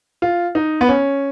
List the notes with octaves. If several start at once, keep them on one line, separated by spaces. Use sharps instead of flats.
F4
D#4
B3
C#4